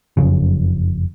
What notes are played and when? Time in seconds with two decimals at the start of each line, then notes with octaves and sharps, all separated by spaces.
0.17 F#1 F2 C#3